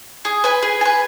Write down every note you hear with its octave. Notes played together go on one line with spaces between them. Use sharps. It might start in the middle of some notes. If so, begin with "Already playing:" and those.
G#4
B4 G#5
G#4
B4 G#5